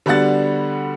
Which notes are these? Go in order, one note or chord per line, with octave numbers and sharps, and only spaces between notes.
D3 G3 B3 F#4 F#5 A6